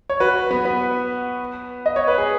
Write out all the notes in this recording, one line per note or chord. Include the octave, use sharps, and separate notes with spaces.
C#5
F#4 B4
B3
B3
D#5
C#5
B4
G#4